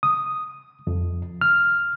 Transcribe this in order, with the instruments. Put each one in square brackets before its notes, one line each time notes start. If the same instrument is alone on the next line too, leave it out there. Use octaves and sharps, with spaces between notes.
[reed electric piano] D#6
F2
F6